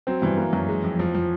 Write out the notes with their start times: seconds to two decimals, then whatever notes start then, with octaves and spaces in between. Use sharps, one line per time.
0.07 F#3 C4
0.22 G2 E3
0.37 A#3
0.53 F#2
0.69 G#3
0.83 F2
0.98 F2 F3
1.15 F3